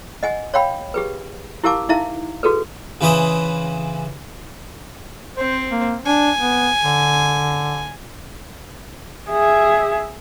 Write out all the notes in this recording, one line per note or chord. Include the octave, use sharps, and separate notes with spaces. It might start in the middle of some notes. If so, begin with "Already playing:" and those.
D#5 F#5 G#5
C#5 F5 G5 B5
G4 G#4 B4
E4 G4 A#4 F5 A5 D6
D#4 E4 E5 F5 A#5
F#4 G#4 A4 B4
C#3 E3 B4 C5 D#6
C4 C5
A#3
D4 G#5
B3
D3
G#4 E5